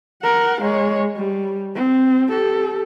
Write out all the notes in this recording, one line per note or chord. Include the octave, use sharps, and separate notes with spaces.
A#4 F#5
G#3 C#5
G3
C4
G4 A4